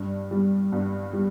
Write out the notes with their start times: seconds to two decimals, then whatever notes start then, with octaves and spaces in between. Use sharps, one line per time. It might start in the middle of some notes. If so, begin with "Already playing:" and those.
Already playing: G2
0.31 G3
0.72 G2
1.13 G3